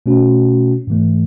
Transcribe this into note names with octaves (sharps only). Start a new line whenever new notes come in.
B2 A3 C#4 F#4
G#2 E3 A3